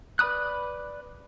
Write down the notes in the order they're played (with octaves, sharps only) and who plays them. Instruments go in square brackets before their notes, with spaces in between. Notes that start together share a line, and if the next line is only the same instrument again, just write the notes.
[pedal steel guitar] B4 D5 B5 D#6 F#6